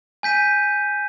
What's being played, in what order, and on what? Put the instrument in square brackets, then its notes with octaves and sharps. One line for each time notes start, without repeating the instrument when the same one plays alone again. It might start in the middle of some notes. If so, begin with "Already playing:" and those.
[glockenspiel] G#5 G6 B6 D#7